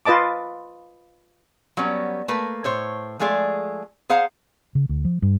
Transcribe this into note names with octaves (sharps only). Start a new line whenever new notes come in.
F4 B4 D#5 A5 D6
F#3 G3 B3 C#4
A3 A#3 B4
A2 C5 C#5
F3 G#3 A3 G#4 D5
G#4 C5 F5 F#5 A#5
C#3
D2
F3
G2